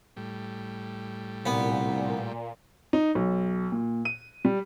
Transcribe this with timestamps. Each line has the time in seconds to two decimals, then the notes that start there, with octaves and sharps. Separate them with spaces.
0.17 A2 G3
1.46 C2 A#2 B3
2.93 D#4
3.15 B1
3.72 A#2
4.05 D#7
4.45 G3